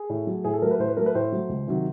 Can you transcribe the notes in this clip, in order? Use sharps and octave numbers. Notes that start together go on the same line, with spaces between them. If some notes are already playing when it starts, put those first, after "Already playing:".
Already playing: G#4
A2
F#3 A3
A2 G#4
A4
F#3 A3 A#4
B4
A2 C5
B4
F#3 A3 A#4
B4
A2 C5
F#3 A3
C#2
C3 D#3 F#3